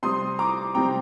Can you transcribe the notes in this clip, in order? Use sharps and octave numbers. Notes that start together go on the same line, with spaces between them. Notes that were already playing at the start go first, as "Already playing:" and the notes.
C3 G3 C4 C6 D#6
A#5 D6
C3 G3 C4 G5 A#5